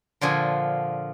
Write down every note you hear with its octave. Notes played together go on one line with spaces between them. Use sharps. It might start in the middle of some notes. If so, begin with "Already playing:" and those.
A#2 D3 F3 G#5